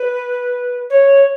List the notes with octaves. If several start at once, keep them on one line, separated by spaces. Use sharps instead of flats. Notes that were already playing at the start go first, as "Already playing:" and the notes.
Already playing: B4
C#5